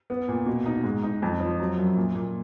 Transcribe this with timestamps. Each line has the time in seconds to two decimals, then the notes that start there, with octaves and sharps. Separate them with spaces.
0.10 B3
0.28 A#2
0.46 B2
0.66 D#4
0.84 G#2
1.03 D#4
1.22 F2
1.40 F3
1.60 F#3
1.77 F#2
1.96 A#2
2.15 A#2